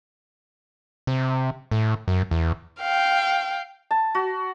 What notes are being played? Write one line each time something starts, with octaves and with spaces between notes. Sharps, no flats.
C3
A2
F#2
E2
F5 G5
A5
F#4